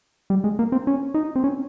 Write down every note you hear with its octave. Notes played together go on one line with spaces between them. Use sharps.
G3
G#3
A#3
C4
C#4
D#4
C4
C#4